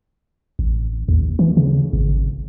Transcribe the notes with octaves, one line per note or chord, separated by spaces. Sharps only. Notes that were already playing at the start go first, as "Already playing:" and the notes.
A1
D#2
E3
C#3
G#1